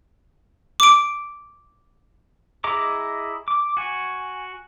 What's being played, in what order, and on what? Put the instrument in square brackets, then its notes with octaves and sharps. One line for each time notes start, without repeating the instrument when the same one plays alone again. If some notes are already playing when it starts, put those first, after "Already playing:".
[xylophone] D6 D7
[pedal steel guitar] E4 G#4 D#5 A#5 D6
D6
F#4 G#5